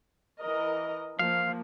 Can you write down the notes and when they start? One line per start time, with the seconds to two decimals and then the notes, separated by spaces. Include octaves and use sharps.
0.40 E3 A#4 D#5
1.19 F3 A#3 F5